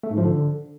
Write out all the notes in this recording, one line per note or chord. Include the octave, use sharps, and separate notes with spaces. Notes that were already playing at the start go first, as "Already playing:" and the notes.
A3
G#2
F3
D3